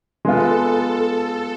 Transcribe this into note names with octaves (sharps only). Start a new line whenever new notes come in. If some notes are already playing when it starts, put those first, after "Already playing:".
G#3 B3 F4 A4